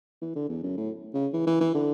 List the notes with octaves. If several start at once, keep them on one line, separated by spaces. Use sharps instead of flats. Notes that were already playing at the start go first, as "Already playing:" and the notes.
E3
D3
E2
F#2
A2
C#3
E3
E3
E3
D3